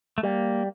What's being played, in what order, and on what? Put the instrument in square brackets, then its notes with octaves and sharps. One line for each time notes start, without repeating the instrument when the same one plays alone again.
[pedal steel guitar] A3
[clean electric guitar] G3 [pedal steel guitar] A#3